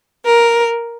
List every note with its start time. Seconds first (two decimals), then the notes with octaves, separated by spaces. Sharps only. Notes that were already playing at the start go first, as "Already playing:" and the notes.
0.25 A#4